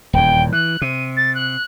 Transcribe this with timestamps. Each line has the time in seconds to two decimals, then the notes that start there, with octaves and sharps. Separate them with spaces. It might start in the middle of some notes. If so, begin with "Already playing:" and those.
0.13 D#1 E2 G5
0.52 E3 F#6
0.82 C3 D#7
1.16 A6
1.34 F#6